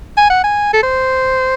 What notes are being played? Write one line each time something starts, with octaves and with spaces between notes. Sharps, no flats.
G#5
F#5
G#5
A4
C5